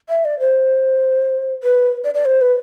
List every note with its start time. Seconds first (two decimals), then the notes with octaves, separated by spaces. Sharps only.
0.09 E5
0.25 D5
0.40 C5
1.63 B4
2.04 D5
2.14 D5
2.25 C5
2.41 B4